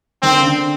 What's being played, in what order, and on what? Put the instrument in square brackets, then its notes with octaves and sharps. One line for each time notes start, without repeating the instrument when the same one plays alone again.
[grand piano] D#3 [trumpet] C4
[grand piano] D3
C#3
D3